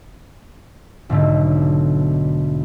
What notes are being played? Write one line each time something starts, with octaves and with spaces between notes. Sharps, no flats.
B1 G#2 D3 A3